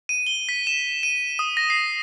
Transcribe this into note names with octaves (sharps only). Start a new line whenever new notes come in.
D#7
G7
B6
E7
D#7
D#6
A#6
C7